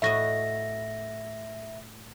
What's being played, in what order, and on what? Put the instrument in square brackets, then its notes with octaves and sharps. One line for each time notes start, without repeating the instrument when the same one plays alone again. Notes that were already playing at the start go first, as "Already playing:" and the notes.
[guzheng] A2 F#4 D#5 [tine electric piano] E5 A#6